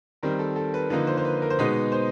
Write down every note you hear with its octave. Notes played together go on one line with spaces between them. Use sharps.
D#3 G3 C4 A#4
A4
A4
B4
D3 F3 A#3 D#4 B4
C5
C5
B4
A#4
C5
B2 G#3 B3 D#4 B4
C5